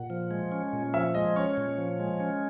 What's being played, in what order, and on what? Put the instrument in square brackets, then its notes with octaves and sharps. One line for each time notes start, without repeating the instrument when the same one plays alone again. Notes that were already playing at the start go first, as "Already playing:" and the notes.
Already playing: [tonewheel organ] A#2 [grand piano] F#5
[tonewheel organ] F3
G#3
C#4
A#2
[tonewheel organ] F3 [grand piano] E5
[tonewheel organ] G#3 [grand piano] D#5
[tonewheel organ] C#4 [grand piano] C#5
[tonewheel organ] A#2
F3
G#3
C#4